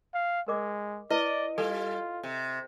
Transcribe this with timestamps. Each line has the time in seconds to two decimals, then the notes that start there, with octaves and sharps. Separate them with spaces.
0.14 F5
0.48 G#3 A#4 D#5 D6
1.10 E4 B4 D5 D#5
1.58 G3 F4 A4
2.23 C3